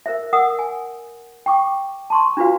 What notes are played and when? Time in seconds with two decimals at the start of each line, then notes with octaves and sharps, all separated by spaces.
0.06 A#4 C5 E5
0.33 A#4 F#5 D#6
0.59 G#5
1.46 G5 C#6 D6
2.10 A5 C6 C#6
2.37 D4 F4 F#4 B4 F5